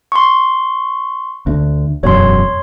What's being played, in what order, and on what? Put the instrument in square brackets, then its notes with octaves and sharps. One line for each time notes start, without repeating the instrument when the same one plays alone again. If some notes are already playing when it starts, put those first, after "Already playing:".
[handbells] C6 C#6
[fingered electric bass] D2
[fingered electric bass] E1 F#2 [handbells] C#5 C6